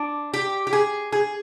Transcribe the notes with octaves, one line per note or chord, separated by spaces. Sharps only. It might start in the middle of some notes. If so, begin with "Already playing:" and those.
Already playing: D4
G4
G4
G#4
G#4